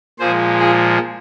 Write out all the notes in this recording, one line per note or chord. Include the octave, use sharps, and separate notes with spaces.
A#2 F3 G#3 G#4 C5
F4 G#4